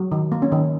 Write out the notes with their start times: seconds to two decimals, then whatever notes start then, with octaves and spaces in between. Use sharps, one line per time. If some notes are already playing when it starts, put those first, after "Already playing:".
Already playing: F#3
0.12 D#3
0.32 A#3
0.42 C#4
0.52 D#3